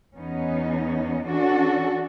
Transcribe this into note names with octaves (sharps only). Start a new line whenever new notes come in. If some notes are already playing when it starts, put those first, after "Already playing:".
E2 B3 C#4 D#4
E3 C#4 D4 F#4 A4